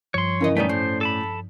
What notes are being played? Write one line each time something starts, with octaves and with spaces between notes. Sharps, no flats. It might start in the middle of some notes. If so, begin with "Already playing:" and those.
G2 F3 C#5 C6
C#3 E3 C#4 A#4 D#5
B2 G3 A3 B3 C#4 D#4 D5
A2 C5
A4 A5 B5